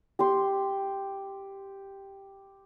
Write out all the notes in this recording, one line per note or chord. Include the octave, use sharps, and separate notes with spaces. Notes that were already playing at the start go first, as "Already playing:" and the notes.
G4 C6